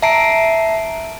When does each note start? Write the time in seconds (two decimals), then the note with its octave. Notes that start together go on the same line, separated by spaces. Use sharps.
0.02 E5 A5 A#5 C7 D7